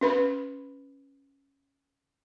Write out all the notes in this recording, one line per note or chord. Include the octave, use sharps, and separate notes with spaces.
C#4 B4 B5